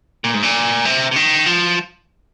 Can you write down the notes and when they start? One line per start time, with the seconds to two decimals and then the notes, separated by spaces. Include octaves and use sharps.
0.24 A#2
0.34 G#2
0.43 A#2
0.85 C3
1.11 C3
1.16 D#3
1.46 F3